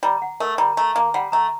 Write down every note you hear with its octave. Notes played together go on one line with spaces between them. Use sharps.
G3 A#5
F#5
A3 A#4
G3 A#5
A3 A#5
A#3 A#5
G3 F#5
A3 A#5